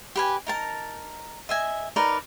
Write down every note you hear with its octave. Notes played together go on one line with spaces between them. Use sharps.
G4 B4 G#5
D#4 A#4 A5
D#5 E5 G#5
D#4 A#4 B4 D5